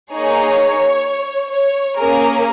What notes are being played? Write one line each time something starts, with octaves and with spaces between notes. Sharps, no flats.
A#3 D#4 G#4 C#5
C#5
A#3 C#4 G#4 A#4